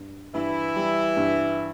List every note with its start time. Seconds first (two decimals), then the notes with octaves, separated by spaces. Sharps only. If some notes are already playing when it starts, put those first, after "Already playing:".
Already playing: G2
0.34 G2 E3 E4
0.76 G3
1.17 G2